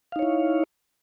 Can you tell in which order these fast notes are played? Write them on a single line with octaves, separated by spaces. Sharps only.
F5 D#4 C#5 E4